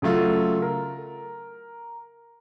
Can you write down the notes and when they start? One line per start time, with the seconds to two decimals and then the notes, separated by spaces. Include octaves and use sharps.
0.02 C#3 F#3 A3 F4
0.62 A#4